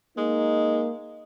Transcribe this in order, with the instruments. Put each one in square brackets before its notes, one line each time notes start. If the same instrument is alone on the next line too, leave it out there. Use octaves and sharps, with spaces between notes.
[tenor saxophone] G#3 [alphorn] A#3 [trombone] D#4